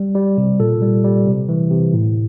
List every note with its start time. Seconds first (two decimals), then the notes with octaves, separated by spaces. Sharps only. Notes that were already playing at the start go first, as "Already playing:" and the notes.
Already playing: G3
0.15 G3
0.38 C3
0.60 A#2 A4
0.82 G3
1.04 G3
1.26 C3
1.49 E3
1.71 C3
1.93 A2